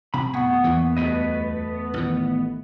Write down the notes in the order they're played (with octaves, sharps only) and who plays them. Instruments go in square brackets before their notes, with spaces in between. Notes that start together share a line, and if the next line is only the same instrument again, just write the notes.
[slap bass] C3 [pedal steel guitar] B5
[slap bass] D1 [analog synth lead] B3 [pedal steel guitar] G#4 F#5 C#6
[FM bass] E2 [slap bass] E3 A#3
[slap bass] D2 G2 [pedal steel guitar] A3 B4 D#5
[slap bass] A1 D#3